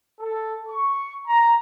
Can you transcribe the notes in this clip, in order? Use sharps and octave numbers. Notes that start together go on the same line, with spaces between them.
A4
C#6
A#5